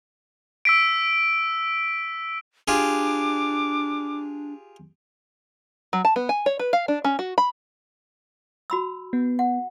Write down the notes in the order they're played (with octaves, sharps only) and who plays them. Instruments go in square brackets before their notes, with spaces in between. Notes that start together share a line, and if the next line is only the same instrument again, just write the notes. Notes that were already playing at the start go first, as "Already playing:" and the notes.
[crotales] E6 B6 D7
[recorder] D4 [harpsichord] F4 G4 G#4 [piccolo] D6
[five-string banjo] F#3
A5
B3
G#5
C#5
B4
F5
D4
C#4
F#4
B5
[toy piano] F#4 B5 E6
[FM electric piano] B3
[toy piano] F#5